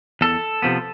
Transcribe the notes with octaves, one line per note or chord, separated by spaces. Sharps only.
E2 A4
C3 F3 B3